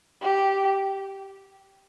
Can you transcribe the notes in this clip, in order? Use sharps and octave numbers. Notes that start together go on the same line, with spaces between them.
G4